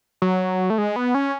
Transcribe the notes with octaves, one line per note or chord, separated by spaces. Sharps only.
F#3
A3
G#3
B3
C#4